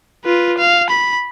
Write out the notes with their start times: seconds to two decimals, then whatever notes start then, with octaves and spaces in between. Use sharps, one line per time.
0.24 F4 B4
0.58 F5
0.90 B5